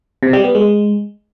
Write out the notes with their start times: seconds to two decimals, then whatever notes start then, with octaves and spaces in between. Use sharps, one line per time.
0.23 C3
0.33 G3
0.44 B3
0.55 G#3